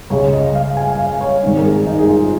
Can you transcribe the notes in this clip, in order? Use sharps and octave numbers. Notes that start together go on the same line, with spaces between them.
C#2 C#3 G#3 C#5
D#5
F5
G#5
F5
C#5
G#1 G#2 D#3
A#4
G#4
D#4
G#4
F4